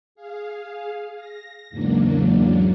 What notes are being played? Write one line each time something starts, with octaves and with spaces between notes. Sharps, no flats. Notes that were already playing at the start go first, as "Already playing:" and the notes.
G#4 F5
A#6
E2 G#2 C#3 F#3 A#3 D4